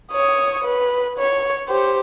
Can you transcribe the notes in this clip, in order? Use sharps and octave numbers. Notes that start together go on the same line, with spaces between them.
C#5 D#6
B4
C#5
G4 C5